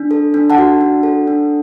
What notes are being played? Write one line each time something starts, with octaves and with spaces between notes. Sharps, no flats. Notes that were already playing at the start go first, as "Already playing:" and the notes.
Already playing: D4
A4
D4
F#5 A5
F#4
D4
A4
D4